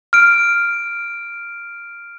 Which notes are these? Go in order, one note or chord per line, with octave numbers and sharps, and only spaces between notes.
F6 D7